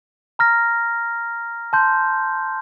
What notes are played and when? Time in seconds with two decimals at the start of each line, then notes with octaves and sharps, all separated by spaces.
0.39 A#5 F6 A#6
1.73 A5 C6 G6